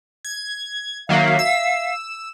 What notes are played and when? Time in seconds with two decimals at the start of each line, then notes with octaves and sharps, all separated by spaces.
0.25 G#6
1.09 D#3 F#3 A#3 E5 F5
1.39 E6